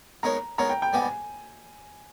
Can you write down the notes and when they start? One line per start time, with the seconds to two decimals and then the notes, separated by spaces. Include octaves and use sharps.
0.23 G#3 B3 D#4 A#4 C#5 A#5
0.58 G#3 B3 D#4 A#4 C#5 A#5
0.70 G5
0.82 G5
0.93 G#2 G3 B3 G4 B4 G#5